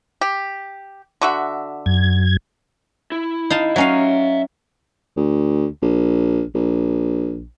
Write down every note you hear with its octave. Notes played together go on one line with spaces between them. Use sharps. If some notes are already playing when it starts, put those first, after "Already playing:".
G4
D3 F#4 E5
F#2 G#6
E4
D#4 F5 A5
F#3 C#4 E5 F5 A#5
D2
A#1
A#1